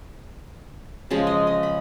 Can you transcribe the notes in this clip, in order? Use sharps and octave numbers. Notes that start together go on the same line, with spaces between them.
C#3 F3 G#3
D#5
D#5
B5